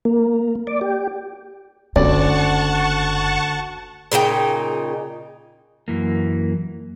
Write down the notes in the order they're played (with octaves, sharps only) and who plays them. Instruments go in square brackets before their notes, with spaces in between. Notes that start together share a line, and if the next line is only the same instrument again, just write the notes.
[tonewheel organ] A#3
D5
G4
[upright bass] F#1 C#4 [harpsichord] D2 [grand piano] D5 [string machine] F#5 A5 C#6
[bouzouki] A#2 C#3 D#4 G5
[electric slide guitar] F#2 E3 A#3